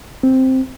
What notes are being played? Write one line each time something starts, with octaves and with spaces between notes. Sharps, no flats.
C4